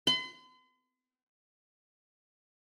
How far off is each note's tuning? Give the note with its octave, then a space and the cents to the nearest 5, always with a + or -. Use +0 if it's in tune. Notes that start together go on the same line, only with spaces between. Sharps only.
C6 -45